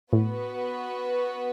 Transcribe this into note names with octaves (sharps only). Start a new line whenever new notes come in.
A2 B3 F#4 B4